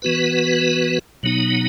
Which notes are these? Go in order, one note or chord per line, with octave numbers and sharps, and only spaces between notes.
E3 B3 F#4 B4
B2 F#3 B3 D#4